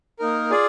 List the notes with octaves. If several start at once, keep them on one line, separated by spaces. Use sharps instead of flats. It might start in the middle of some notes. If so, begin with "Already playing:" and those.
A#3 D#4 A#4
F4 G#4 D5